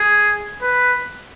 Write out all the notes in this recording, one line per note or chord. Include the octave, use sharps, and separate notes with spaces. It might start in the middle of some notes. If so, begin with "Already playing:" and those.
Already playing: G#4
B4